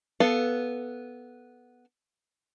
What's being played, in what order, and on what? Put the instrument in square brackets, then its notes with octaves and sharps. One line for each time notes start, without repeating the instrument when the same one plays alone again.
[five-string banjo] B3 A4 F5